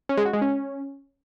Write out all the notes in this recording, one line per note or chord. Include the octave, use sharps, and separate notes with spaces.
C#4
G#3
F#4
G#3
C#4